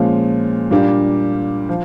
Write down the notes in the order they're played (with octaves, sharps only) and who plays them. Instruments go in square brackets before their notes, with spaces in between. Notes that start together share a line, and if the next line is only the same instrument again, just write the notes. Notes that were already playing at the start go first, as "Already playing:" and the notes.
Already playing: [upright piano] A#2 F3 G#3 C#4
A#2 G3 A#3 D4 G4
F3